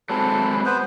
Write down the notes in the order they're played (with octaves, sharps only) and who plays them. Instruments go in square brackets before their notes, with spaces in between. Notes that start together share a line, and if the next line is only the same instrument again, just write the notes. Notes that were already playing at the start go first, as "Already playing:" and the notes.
[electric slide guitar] F#3 G#3 C4 [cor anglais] A4 [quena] B5
[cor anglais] B3 [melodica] B4 C5